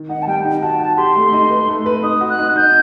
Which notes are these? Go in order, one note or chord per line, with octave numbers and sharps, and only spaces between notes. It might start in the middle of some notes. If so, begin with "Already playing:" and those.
Already playing: D#3
D#4 F#5
A5
G3 G5
D#4
F#4 A5
F#4 A5
G4 C6
A3
D#4
B4
A3
B4
D#4 D#6
F#4
F#6
D#4
D#4 G6